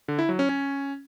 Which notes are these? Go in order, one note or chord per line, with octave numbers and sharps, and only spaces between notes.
D3
E4
F#3
C#4
C#4